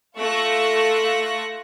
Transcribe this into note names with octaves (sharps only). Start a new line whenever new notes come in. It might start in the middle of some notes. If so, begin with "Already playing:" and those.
A3 F4 C#6 E6 F#6 A#6